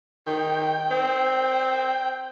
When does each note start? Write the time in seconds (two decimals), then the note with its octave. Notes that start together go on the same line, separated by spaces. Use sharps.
0.27 D#3 G5
0.91 C4